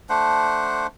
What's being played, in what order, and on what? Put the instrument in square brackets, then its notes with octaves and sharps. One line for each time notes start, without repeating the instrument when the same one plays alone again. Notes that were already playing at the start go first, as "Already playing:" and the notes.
[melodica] A3 D4 C5 F#5